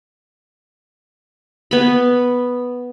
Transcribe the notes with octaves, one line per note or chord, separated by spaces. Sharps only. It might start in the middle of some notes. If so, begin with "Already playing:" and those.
B3 B5